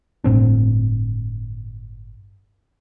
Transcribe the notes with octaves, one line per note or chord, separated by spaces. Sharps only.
G1 A2 C4 D4